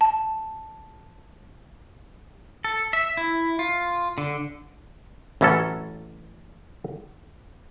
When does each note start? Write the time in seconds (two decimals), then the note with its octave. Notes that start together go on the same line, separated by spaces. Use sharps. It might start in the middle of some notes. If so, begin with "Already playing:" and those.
0.01 A5
2.64 A4
2.93 E5
3.17 E4
3.59 F4
4.18 D3
5.41 A1 E3 F#3 C#4 A4